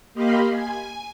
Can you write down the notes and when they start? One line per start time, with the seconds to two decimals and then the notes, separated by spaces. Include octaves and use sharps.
0.14 A#3 G4 D#5 F5 B5 C6
0.51 G#5